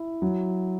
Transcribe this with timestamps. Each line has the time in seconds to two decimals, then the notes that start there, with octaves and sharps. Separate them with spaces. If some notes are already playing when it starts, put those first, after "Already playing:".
Already playing: E4
0.22 F#3